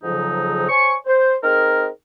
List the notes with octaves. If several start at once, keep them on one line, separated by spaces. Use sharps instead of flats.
F2 G#2 C#3 F3 F#3 D#4
C5 C#5 G#5 C#6
C5
C4 D#4 G#4 A#4